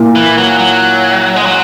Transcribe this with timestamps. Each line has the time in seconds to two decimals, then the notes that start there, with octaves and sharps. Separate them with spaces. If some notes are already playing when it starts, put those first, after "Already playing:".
Already playing: A#2 A#3 E4
0.16 E3
0.38 F#3
0.59 F#3
1.36 G#3
1.46 F#3